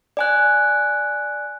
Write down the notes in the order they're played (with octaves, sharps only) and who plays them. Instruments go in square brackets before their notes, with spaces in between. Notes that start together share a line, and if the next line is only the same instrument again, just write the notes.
[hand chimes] D5 G#5 F#6